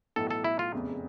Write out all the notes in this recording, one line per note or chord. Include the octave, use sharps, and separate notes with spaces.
B1 A2 E3 A4
A4
E4
F4
F1 E2 C#3